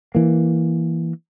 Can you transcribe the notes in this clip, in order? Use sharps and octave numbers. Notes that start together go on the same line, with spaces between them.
E3 A#3